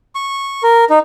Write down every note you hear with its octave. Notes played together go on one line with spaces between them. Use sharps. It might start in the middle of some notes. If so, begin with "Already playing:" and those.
C#6
A#4
D#4